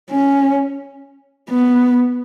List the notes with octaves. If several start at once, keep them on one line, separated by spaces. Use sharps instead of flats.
C#4
B3